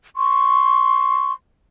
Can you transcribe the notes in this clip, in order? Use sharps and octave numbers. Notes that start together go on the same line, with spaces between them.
C6 C#6